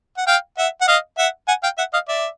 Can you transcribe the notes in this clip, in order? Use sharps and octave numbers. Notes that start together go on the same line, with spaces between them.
F#5
F5 G5
E5 F#5
F#5
D#5 F5
E5 F#5
F#5 G#5
F5 G5
E5 F#5
D#5 F5
D5 E5